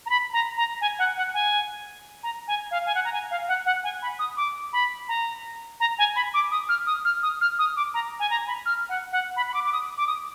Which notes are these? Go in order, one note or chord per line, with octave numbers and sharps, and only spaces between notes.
A#5
B5
A#5
A#5
G#5
F#5
F#5
G#5
A#5
G#5
F5
G#5
F#5
A#5
G#5
F5
F#5
F#5
G#5
B5
D#6
D6
B5
A#5
A#5
G#5
B5
D6
D#6
F6
D#6
F6
D#6
F6
D#6
D6
A#5
G#5
A#5
B5
F6
F#5
F#5
B5
B5
D6
D6
D#6
D6
D#6